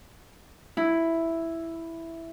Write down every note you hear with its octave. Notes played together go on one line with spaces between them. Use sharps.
E4